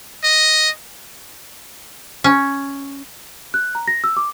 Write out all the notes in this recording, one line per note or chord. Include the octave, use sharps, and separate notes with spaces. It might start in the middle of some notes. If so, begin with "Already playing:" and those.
D#5
C#4
F#6
A#5
A#6
E6
D6